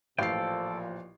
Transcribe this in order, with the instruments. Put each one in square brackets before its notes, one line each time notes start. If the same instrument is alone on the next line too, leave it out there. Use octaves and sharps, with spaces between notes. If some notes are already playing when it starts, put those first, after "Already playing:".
[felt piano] A1 C7 [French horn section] A#2 F3 [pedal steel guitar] A4 G5 [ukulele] F5